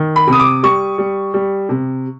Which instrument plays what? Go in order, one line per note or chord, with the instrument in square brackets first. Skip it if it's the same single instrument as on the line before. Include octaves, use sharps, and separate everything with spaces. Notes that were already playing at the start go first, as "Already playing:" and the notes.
Already playing: [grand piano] D#3
B5
C3
D#6
D6
G3 C#6
G3
G3
C3